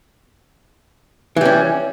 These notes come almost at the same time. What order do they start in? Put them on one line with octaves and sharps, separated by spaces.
E3 G3 C#4